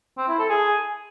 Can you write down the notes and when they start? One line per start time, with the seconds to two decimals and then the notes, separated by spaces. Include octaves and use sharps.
0.17 C4
0.28 E4
0.39 A4
0.49 G#4